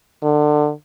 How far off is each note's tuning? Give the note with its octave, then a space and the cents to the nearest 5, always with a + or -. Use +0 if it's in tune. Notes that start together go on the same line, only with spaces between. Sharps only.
D3 +25